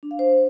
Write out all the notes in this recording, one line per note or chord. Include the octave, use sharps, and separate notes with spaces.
D4
F5
C5